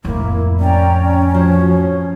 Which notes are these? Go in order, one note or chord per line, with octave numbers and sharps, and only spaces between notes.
F2 A2 A#3 E4
C#4 D5 G5 A#5
F3 F#4 C#5